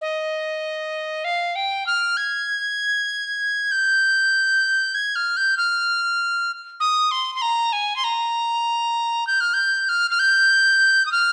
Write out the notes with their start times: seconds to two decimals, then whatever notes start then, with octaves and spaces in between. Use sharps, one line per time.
0.01 D#5
1.24 F5
1.56 G5
1.87 F6
2.17 G#6
3.71 G6
4.95 G#6
5.16 F6
5.37 G6
5.57 F6
6.80 D#6
7.11 C6
7.35 C6
7.42 A#5
7.73 G#5
7.96 C6
8.04 A#5
9.27 G6
9.41 F6
9.54 G6
9.89 F6
10.11 F6
10.19 G6
11.06 D#6
11.12 F6